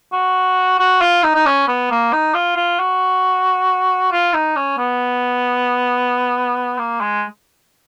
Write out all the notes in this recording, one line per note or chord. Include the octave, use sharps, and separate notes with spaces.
F#4
F#4
F4
D#4
D#4
C#4
B3
A#3
D#4
F4
F4
F#4
F4
D#4
C#4
B3
A#3
G#3